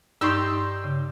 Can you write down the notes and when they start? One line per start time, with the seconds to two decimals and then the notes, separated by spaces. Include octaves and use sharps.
0.21 G2 D#4 G4 D5 C6 C#6 E6
0.84 C#3